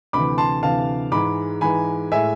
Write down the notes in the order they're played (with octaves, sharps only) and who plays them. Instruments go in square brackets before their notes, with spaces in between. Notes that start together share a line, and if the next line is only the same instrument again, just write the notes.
[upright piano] D2 C3 E3 B5 D6
A5 C6
D2 C3 E3 F5 A5
G#2 E3 G#3 B5 D6
G#2 E3 G#3 G#5 B5
A2 G#3 E5 G#5